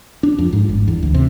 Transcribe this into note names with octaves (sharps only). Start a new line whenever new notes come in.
D4
F2
G#2
G1
E2
D2
C3